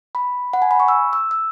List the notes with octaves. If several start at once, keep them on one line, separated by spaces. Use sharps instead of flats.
B5
F#5
G#5
B5
C#6
E6
E6
E6